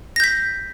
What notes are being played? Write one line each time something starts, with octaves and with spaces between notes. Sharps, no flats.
G6 A#6 B6